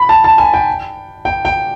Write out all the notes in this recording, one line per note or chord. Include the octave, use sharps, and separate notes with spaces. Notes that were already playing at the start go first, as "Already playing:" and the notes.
Already playing: B5
A5
A5
G#5
G5
G5
G5